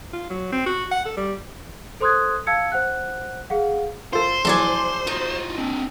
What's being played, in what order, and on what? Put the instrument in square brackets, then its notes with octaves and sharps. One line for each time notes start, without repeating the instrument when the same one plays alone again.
[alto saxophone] F4
F#3
C4
F#4
F#5
A4
G3
[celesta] A4 C5 C6 D#6 F#6 G#6
F5 A5 E6 G#6 C#7
C5 F#5 F#6
G#4 F5 F#5
[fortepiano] F4 A4 A#4 [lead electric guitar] C5 [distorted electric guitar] C6
[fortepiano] A#1 E3 F#3 [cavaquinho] A4 D5 G#5
[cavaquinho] D#4 [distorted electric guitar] F4 F#4
[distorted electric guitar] C4 D4